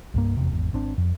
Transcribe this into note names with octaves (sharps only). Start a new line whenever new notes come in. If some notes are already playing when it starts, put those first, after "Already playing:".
C2 G2 A#3
F1 E2 C3
G#1 E2
G#1 C4 D4
F2